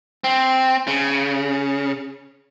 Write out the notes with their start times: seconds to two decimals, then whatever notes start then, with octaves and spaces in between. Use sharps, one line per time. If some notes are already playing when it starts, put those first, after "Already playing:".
0.24 C4
0.87 C#3